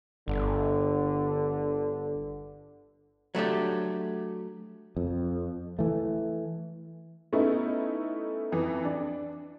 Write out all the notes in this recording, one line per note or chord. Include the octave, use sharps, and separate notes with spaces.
G1 D3
F#3 A3 D4 G4
F2
E3 A3
A3 B3 C#4 D#4 E4
F2 E3
D4